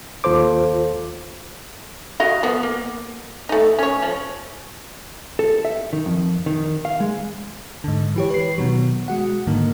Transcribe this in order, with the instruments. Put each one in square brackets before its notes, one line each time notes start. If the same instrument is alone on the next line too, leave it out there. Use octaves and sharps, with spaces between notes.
[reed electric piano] D#2 F4 A4 C5 D6
[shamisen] F#4 D#5 F5
F3 B3 F#4
A#3
A3 D#4
C#4 C#5
F3
[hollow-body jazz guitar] A4
E5
D#3
F2
D#3
F5
G#3
[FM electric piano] G#2 D3
E3 G4 C#5
B4 C7
B2 D#3 F#3
G#3 F#4 F#5
G#2 D3 D#3 A#3